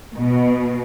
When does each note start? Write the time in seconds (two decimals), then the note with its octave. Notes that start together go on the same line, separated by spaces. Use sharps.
0.16 B2